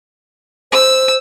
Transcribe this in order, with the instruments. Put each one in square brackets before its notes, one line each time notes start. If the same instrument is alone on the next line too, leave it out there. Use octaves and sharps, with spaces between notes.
[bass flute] C5 [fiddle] E6